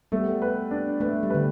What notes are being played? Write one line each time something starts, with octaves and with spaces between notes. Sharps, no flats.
G3 A3 B3
B4
D4
A3 B4
G3
D3 B4